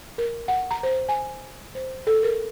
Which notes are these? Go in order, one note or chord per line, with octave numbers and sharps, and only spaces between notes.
A#4
F#5
A#5
C5
G#5
C5
A4
A#4